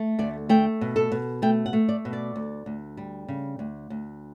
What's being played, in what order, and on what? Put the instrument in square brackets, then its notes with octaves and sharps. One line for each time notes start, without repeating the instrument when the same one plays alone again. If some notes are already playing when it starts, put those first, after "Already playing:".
Already playing: [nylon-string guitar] A3
D2 D5
A3 G5
B2
A4
B2
A3 G5
F#5
A3
D5
B2
D5
D2
D2
G3
C#3
D2
D2